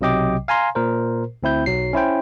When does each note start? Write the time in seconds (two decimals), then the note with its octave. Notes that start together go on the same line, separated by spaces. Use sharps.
0.01 B1 C3 F#3 D#5 G5 D6
0.48 F5 G#5 A#5 C6
0.75 A#2 A#4 C5
1.43 D2 C4 E4 G6
1.66 B1 F#3 C7
1.93 C#4 E4 C5 G5